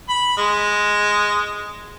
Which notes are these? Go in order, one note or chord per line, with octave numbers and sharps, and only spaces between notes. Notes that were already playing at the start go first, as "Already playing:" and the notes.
B5
G#3